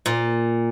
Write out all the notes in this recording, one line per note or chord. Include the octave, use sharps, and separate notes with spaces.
A#2